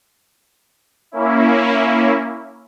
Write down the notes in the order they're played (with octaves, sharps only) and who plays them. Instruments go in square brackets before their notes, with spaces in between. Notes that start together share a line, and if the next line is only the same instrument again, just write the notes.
[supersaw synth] A#3 C#4 E4